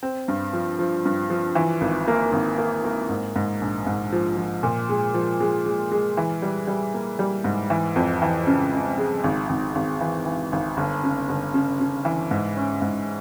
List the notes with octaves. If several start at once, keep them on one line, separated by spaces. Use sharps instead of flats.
C4
G2
F3
F3
G2
F3
E3
G#1
A#3
G#1
A#3
A#3
G#2
G#2
A#1
G#2
F3
F3
A#2
G#3
F3
G#3
G#3
G#3
E3
G3
G3
A#3
G3
G#2
E3
F2
E3
C#3
C#3
G#3
G#1
G#1
G#1
E3
E3
G#1
G1
C#3
G1
C#3
C#3
E3
G#2
C#4
G#2